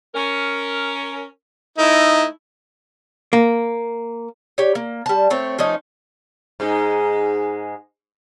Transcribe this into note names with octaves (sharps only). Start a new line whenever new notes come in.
C#4 A#4
A3 D#4 E4
A#3
G4 C#5
A#3
G3 A5
A3 C4 C#5
F3 A3 C#4 D#4
G#2 G#3 D#4